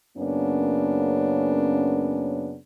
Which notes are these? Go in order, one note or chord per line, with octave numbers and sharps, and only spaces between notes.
F#2 C#3 A#3 B3 C#4 D4